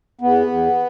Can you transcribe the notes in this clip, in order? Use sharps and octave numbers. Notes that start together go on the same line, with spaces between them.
E2 B3
E2